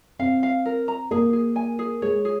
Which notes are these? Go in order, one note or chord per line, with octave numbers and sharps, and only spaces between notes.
C4 F5
F5
A#4
A#5
A#3 G#4
G#4
G#5
G#4
G#3 C#5
G#4